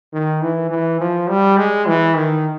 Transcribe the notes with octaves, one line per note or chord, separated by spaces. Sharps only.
D#3
E3
E3
F3
G3
G#3
E3
D#3